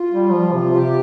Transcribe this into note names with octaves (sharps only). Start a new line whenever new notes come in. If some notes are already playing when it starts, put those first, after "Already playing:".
Already playing: F4
G3
F3
C3
C3 G4